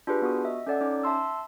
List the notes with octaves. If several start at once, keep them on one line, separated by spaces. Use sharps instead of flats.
D4 F4 G4 G#4 B4
B3 F#4 D#6
D#5 E5
C#4 A4 D5 F#5
C#4 D#4 D6
E5 A5 C6 E6